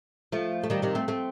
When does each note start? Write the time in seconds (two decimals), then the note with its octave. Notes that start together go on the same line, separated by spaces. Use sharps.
0.32 F3 A3
0.63 A3
0.70 D#3 G3
0.82 C3 D#3
0.95 A3 C4
1.08 A3 C4